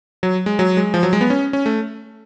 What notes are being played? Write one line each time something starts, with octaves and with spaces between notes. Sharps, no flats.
F#3
G#3
F#3
G#3
F3
F#3
G#3
B3
C#4
C#4
A3